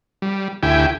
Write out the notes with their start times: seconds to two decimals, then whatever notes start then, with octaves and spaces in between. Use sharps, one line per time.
0.22 G3
0.63 D2 E4 G4 G5 G#5